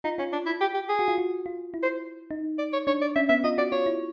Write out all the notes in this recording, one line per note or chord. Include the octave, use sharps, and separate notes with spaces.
D#4 F4
C#4 F4
D4
E4
G4
G4
G#4
F#4
F4
F#4
F4
E4
C5
D#4
D5
C#5
D4 C#5
D5
C#4 E5
B3 E5
F4 D#5
F#4 D5
F4 C#5
E4